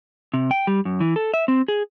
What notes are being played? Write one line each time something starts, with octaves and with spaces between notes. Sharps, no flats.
C3
G5
G3
F#2
E3
A4
E5
C4
G#4